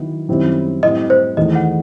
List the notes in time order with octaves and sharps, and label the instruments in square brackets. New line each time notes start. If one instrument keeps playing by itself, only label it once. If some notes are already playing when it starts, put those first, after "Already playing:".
Already playing: [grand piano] D#3 F#3 B3 E4
F#2 D#3 G3 C4 E4
[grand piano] A2 G3 C4 E4 [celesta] D#5
[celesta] C5
[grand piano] E2 D#3 A3 E4 [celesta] D#5
[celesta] F#5